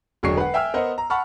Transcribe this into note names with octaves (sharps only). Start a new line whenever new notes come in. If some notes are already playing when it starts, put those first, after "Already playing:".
E1 D3 F#3 G#4 C#6 C7
B4 F#5
E5 G5 G#5 E6 F6
B3 A#4 C5 D#5 F#5
A#5
F#5 A5 B5 C#6 F6